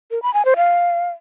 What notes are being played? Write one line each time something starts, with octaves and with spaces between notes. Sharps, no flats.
A#4
B5
G#5
C5
F5